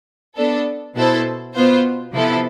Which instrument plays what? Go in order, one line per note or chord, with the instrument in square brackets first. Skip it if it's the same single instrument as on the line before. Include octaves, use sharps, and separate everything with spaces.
[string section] B3 D4 A4
B2 B3 E4 A4 C5
B2 B3 F4 C5
C3 F3 B3 E4 A4